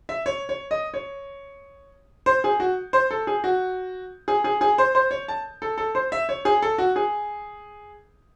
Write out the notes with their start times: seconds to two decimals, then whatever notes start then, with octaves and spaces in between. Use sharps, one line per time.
0.09 E5
0.26 C#5
0.49 C#5
0.71 D#5
0.94 C#5
2.26 C5
2.44 G#4
2.60 F#4
2.93 C5
3.11 A4
3.27 G#4
3.44 F#4
4.28 G#4
4.44 G#4
4.61 G#4
4.78 C5
4.95 C5
5.11 C#5
5.28 A5
5.62 A4
5.78 A4
5.95 C5
6.12 E5
6.29 C#5
6.45 G#4
6.62 A4
6.78 F#4
6.96 G#4